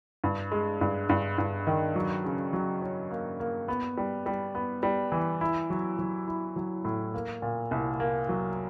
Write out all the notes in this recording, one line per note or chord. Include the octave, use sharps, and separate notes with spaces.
G2
G#3
G2
G2
G2
D#3
F#3
C#3
F#3
C#4
A#3
A#3
B3
G3
G3
B3
G3
E3
E4
F#3
F#3
E4
F#3
A2
A#3
A#2
C2
A#3
F#3